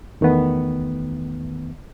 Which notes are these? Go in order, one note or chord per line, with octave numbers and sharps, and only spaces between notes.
E2 D#3 A3 B3